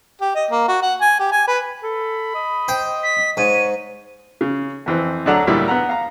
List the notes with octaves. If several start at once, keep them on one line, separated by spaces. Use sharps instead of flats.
G4
D#5
A#3
F#4
F#5
G#5
G4
G#5
B4
A4 B5
D#5
C5 G5
B6
G#2 C#5 D#7
C#3
F2 E3 C4
D2 F#3 A3 D4 F#5 A#5
D2 A#2 G3 E4
B3 F#5 A#5
F5 A#5